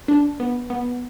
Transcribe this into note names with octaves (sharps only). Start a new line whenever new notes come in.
D4
B3
B3